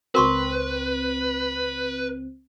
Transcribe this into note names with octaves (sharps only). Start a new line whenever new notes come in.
C#2 C4 A#4 B4 C6 C#6